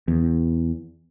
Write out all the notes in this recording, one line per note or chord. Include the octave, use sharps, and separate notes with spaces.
E2